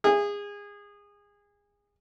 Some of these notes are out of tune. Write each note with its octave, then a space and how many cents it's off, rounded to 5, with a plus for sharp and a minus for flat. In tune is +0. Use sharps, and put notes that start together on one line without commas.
G#4 -25